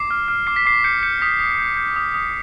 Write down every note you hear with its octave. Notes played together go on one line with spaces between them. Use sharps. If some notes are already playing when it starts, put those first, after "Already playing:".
Already playing: D6 C7
F6
F6
D6 C7
B6
D6 C7
G6 C#7
G6 C#7
D#6 B6
D#6
G6
G6
D#6
D#6